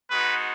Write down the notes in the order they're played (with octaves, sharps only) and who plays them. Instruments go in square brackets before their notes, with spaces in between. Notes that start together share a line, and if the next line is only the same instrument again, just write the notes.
[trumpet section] G#3 B3 D#4 F#4 B4